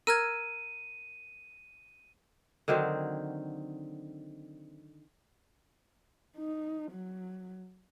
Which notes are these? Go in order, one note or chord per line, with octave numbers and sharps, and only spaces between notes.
A#4 E6 F6 G#6 D#7
D3 D#3 F#3 C4
D#4
F#3